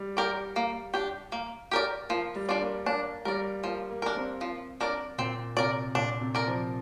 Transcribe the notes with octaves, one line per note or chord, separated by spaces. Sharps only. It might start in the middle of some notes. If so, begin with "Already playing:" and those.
Already playing: G3
G4 A#4 D5
A#3
D4 G4
A#3
G4 A#4 D5
F3 A#3
G3
D4 F4 D5
A#3
A#3 D4
G3 A#4 D5
F3 A#3
A#3
D4 A#4
C4
F3
D4 A#4 D5
A#2 C4
C3 A#4 D5
A#2 D4
C3
A#4 D5
F3